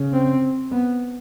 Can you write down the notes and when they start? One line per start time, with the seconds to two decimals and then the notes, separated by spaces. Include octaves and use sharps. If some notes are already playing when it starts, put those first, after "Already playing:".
Already playing: C#3
0.13 C4
0.71 B3